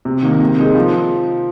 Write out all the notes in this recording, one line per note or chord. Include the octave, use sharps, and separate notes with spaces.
C3
D#3 A#3
C3
G#3 D#4 A#4
F3